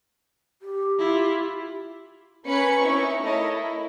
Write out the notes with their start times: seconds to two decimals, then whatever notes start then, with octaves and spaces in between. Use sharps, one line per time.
0.62 G4
0.98 E4 F4
2.45 A#3 C#4 B4 B5 C#7
2.80 C#4 D#4 E4 C#6
3.22 A3 E4 A#4 C#5 D#5 A5
3.54 E4